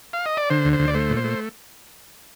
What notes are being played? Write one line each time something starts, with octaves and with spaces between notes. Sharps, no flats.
F5
D#5
D5
D3 C5
D2
C5
D2
D5
A3 C5
A#2
C5
A3